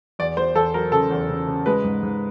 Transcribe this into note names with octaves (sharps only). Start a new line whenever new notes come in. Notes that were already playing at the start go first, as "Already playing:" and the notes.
E2 D5
E2 C5
E2 A4
F#3 A#4
C#3 A4
E2
C#3
C#3
G#3 B4
G#2
G#2